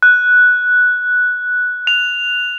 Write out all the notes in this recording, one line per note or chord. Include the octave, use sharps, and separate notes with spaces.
F#6
F7